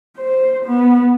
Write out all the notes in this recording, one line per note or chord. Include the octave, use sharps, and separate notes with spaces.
C5
B3